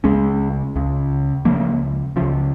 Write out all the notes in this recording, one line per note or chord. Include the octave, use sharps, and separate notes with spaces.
C#2 C#3 G#3 C#4
C#2 C#3
C#2 C#3 F3 A#3
C#2 C#3 F3